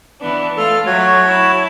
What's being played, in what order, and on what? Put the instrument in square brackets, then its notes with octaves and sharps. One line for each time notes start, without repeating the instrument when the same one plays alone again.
[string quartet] E3 B3 D4
[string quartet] A3 F4 F6 [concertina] A4
[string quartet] F#3 A3 [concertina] F#4 C#5
[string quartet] E4 A5